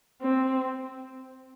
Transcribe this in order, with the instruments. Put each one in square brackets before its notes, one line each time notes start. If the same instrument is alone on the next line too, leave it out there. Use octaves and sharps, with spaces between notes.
[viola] C4